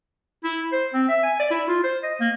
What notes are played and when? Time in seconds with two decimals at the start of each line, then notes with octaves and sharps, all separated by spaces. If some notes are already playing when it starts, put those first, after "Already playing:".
0.44 E4
0.72 C5
0.94 C4
1.09 E5
1.23 G#5
1.39 D5
1.51 E4
1.69 F4
1.84 C5
2.03 D#5
2.21 A#3